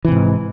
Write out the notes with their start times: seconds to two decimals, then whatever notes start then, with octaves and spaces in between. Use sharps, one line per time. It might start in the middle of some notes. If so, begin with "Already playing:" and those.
0.05 E3
0.08 C3
0.12 G#2